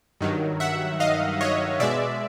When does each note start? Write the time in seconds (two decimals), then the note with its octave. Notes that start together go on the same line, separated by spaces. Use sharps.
0.21 G2 D#3 F#3
0.60 E5 F#5
1.00 D#5 F5
1.41 C#5 D#5
1.80 B2 G#3 D5 E5